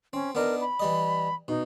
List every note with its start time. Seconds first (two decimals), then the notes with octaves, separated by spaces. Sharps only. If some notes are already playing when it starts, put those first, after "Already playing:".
0.13 C4 C#4
0.35 B3 D4 D#4 A#4
0.61 B5
0.80 E3 G3 D#5
1.48 B2 D#4